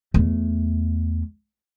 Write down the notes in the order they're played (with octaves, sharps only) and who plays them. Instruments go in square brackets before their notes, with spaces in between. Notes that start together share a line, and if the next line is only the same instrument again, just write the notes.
[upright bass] E2 A3